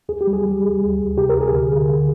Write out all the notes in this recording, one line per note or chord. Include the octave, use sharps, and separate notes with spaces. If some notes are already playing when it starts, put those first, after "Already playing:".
D#2 G#4
G4
G3
G#4
G3
D#2
D2
D2
C3 G4
A#4
D2
G#4
D3
D3
D3